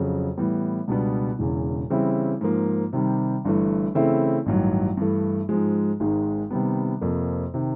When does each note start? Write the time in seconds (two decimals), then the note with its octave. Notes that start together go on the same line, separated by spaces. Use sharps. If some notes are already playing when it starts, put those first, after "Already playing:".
Already playing: F2 C#3 F#3
0.37 A2 E3 G3 B3
0.88 C#2 B2 G3 B3 D4
1.39 E1 E2 C#3
1.90 C#3 E3 G3 C4 E4
2.41 G#2 F3 A#3
2.93 C3 D#3 G3
3.45 G1 G2 E3 A3
3.95 C#3 E3 A3 C4 E4
4.46 A1 G2 D#3 F#3
4.97 G2 E3 A3
5.49 G#2 F3 G#3
6.00 G#1 G#2 D#3 G#3
6.51 C3 D#3 G3 B3
7.01 F2 C3 F3 A#3
7.54 C3 D#3